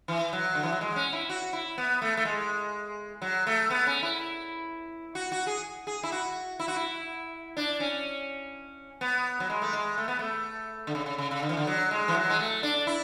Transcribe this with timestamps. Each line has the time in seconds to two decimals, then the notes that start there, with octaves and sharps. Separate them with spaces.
0.08 E3
0.33 F#3
0.55 D3
0.63 E3
0.72 F#3
0.81 G#3
0.96 C#4
1.13 E4
1.30 F#4
1.53 E4
1.78 B3
2.02 A3
2.17 A3
2.25 G#3
3.22 F#3
3.47 A3
3.70 B3
3.87 C#4
4.03 E4
5.15 F#4
5.32 F#4
5.47 G#4
5.87 G#4
6.03 E4
6.12 F#4
6.60 E4
6.68 F#4
6.76 E4
7.57 D4
7.80 C#4
9.01 B3
9.40 F#3
9.50 G#3
9.62 A3
9.73 G#3
9.98 A3
10.08 B3
10.19 A3
10.87 D3
10.95 C#3
11.06 C#3
11.18 C#3
11.31 C#3
11.42 D3
11.49 E3
11.57 D3
11.67 F#3
11.91 G#3
12.08 E3
12.14 F#3
12.30 G#3
12.39 A3
12.63 D4
12.87 E4